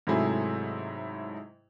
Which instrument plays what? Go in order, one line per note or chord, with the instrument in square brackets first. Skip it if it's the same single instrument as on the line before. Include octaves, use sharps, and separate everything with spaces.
[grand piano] G#2 C3 F#3 A3 E4 G#4